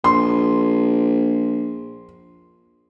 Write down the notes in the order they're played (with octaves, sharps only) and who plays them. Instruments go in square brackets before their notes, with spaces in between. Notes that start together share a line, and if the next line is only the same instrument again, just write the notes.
[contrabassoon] A#1 [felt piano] C6